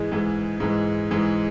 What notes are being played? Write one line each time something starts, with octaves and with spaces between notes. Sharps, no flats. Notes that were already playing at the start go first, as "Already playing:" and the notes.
Already playing: G#2 E3 G#3
G#2 E3 G#3
G#2 E3 G#3
G#2 E3 G#3